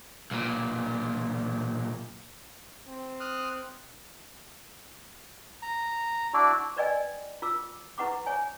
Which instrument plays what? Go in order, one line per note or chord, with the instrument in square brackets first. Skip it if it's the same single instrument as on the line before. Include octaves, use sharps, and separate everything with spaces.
[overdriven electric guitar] B1 A#2
[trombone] C4
[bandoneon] D#6 F6 F#6
[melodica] A#5
D4 E4 F#4 D5
[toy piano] A#4 B4 D5 D#5 G5 G#5
F4 A#4 D6 E6
E4 B4 F#5 C#6 D6
C5 C#5 G#5